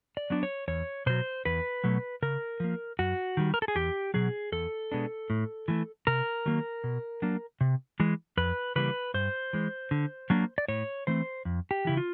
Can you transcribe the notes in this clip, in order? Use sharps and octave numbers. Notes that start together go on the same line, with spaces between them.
D5
F#3 B3 D4
C#5
E2 C#5
B2 F#3 C5
E2 B4
B2 F#3 A3
C#3 A#4
F3 A#3
F#2 F#4
D#3 G3
A#4
A4
G#4
E2 G4
B2 F#3 G#4
E2 A4
B2 G#3 B3 D4
A2
E3 A3
C3 A#4
D#3 F#3 A#3
B2
F#3 A#3 D4
C3
E3 G#3
F2 B4
C#3 E3 G3 A#3 B4
G2 C5
E3 G#3
D3
F#3 A#3 D4
D5
A2 C#5
E3 A3 C4 C5
F2
G4
C#3 E3 E4
F4